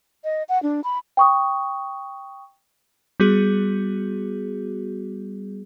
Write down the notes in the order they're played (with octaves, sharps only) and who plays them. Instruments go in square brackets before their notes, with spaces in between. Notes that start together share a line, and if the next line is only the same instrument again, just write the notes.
[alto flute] D#5
F#5
D4
B5
[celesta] G5 C#6 D#6
[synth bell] G3 B3 F#4 G#4